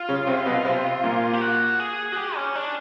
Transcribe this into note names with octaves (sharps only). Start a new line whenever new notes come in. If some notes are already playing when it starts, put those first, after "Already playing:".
Already playing: F4
C#3 C#4
C3 C4
B2 B3
C3 C4
A#2 A#3
G4
F#4
G#4
F#4
G4
C#4
D4